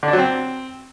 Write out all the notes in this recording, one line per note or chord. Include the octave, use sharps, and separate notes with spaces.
D3
D4
F#3
C4